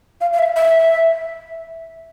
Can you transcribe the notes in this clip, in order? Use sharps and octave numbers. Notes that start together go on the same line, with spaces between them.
F5
F5
E5
E5